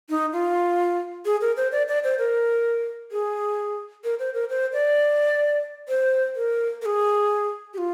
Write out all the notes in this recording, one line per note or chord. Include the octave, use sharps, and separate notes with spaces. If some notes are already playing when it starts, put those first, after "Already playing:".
D#4
F4
G#4
A#4
C5
D5
D5
C5
A#4
G#4
A#4
C5
A#4
C5
D5
C5
A#4
A#4
G#4
G4
F4